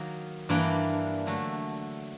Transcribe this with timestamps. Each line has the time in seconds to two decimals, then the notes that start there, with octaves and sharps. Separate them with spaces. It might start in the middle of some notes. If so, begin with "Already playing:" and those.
Already playing: D#3 F#3 A#3
0.49 G2 E3 G3 A#3 D4
1.26 D3 F#3 A3